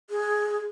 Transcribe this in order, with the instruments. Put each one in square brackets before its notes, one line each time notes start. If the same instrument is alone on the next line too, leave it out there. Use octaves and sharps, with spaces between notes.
[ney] G#4